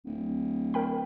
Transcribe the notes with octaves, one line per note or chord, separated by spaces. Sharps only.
D1
A#4 G5 B5